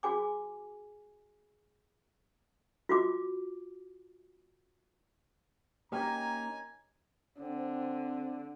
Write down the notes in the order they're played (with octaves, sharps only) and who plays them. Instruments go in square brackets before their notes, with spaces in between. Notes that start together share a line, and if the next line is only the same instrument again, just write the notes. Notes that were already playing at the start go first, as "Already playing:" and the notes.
[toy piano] F#4 G#4 G#5 D6
F4 F#4 D6
[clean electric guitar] A#3 C#4 D#4 [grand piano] G4 [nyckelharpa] G#5 [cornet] A#5
[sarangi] D3 [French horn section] C4